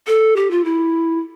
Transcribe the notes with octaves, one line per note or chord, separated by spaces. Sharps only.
A4
G4
F4
E4